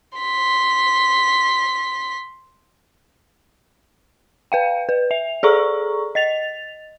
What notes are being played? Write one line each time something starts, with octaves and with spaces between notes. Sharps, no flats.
C6 B6
B4 F5 G5
B4
E5 F7
G#4 A4 D5 A#5 C#6
D#5 A6 F7